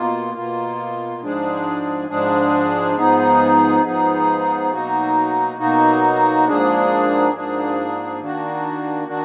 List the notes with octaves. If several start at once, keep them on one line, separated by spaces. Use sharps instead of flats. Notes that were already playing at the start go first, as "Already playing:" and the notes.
Already playing: B2 A#3 F4
B2 A#3 F4
G#2 F3 G#3 D4 G#4
G#2 F3 G#3 D4 G#4
G#2 F3 B3 D#4 G#4
G#2 F3 B3 D#4 G#4
B2 F#3 A#3 D#4 F#4
B2 F#3 A#3 D#4 F#4
G#2 F3 A#3 D4 G#4
G#2 F3 A#3 D4 G#4
D#3 A#3 D4 F#4
D#3 A#3 D4 F#4